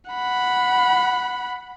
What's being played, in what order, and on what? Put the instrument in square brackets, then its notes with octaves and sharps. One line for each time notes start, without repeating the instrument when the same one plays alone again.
[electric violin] F#5 B5